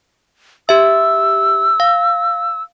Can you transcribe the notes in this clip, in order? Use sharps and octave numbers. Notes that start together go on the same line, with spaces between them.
G4 E5 E6
F5